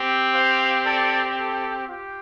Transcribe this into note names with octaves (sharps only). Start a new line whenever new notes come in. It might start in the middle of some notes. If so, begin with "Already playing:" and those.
Already playing: C4 G4
C5 F5
A4 D5
A4
F4 G4